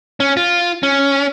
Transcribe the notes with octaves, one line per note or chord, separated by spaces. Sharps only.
C#4
F4
C#4